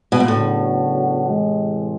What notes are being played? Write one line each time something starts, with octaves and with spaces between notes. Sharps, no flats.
B2
A#2
A2 C#3 F#3 B3 D4 F#4
C3 E3 G#3